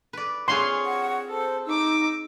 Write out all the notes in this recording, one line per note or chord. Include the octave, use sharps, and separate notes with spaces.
B4 D5
C4 F4 G#4 C#5 C6
F#5
A4 C5
D#4 D6 E6